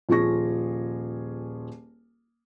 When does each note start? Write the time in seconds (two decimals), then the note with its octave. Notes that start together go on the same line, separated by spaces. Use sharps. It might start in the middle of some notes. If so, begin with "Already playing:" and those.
0.09 D#1 F3 F4 G#4 C#6 A#6